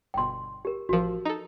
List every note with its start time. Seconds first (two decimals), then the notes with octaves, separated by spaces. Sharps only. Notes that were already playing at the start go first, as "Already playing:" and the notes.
0.14 G1 B2 G5 C6
0.65 G4 A#4
0.89 A1 F3 F#4 A#4
1.26 D#4 A4